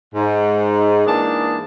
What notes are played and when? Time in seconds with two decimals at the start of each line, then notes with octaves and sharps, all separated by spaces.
0.15 G#2
1.06 G#2 E3 A#3 D4 G#4 A5